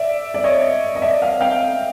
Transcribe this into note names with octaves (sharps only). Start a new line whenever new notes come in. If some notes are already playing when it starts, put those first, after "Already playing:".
Already playing: D5 E5
D5
C#5 D#5
D#5
D5 E5
D#5 F5
F5 G5